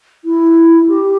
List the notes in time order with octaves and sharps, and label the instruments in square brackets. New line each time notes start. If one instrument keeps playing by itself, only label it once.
[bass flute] E4
G4